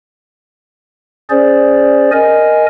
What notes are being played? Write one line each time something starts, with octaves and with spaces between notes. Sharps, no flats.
C#4 G#4 C5 D5
A#4 D#5 G#5